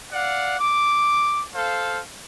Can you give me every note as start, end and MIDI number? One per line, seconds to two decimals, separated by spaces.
0.12 0.59 74
0.12 0.59 77
0.12 0.59 78
0.59 1.43 86
1.53 1.99 69
1.53 1.99 72
1.53 1.99 77